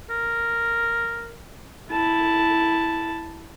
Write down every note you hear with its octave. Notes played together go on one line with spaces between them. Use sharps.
A#4
E4 A5